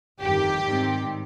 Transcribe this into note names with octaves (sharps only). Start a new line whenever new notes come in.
G1 F2 D#3 G4
G#2 D#3 G3 C4